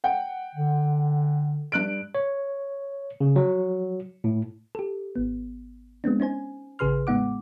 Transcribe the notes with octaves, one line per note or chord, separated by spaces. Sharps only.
F#5 G5
D3
G2 F#6 D7
C#5
C#3
F#3
A2
G4 A4
G#1 B3
G#3 B3 C4 D4
C#4 D#4 C5 G#5
A1 C#3 G#4 B4 C6 F6
A2 G#3 B3 D#4 F#5 D6